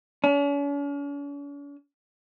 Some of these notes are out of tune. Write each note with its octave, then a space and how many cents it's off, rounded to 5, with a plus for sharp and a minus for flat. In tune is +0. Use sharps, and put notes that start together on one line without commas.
C#4 +45